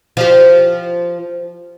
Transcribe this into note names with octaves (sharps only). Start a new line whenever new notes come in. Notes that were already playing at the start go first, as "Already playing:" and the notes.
F3 G4